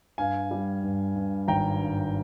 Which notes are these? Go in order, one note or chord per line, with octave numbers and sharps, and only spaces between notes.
G2 F5 G#5
G3
G2
G2
G#1 G5 A#5
G2